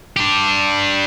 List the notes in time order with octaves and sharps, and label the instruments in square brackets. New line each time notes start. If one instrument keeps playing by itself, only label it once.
[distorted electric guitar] D4 G4